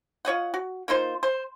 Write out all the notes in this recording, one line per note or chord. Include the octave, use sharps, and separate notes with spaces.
F4 C#5 D#5 F#5
F#4
A#3 D#4 F4 C5
C5